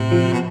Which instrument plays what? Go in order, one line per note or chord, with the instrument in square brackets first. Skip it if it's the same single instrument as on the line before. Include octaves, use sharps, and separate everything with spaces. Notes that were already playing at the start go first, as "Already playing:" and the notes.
Already playing: [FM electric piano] A2 [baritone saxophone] C3
[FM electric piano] F3
[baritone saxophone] B2